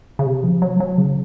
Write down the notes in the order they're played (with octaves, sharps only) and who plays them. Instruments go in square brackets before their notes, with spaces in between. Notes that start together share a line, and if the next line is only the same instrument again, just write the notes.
[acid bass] C#3
C3
F3
F#3
F#3
C#3